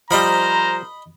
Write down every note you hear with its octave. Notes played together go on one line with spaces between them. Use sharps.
F3 G3 A#4 C5 D#5 A#5 B5